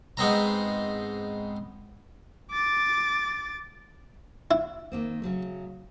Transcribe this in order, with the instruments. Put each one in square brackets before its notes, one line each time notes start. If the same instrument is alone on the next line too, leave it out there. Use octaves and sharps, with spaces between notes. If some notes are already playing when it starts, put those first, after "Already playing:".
[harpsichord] G#2 B3 C4 A#5
[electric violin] D6 A6
[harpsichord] E4
[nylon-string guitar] D#3 A#3 C4
C#3 F#3 A3